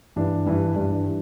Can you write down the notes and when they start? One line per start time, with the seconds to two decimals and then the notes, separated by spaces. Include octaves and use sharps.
0.16 G2 E3 G3 D4
0.46 G2 E3 G3 D4
0.76 G2 E3 G3 D4
1.07 E3